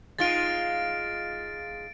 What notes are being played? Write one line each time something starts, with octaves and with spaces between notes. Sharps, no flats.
G#3 D#4 F4 A6 D7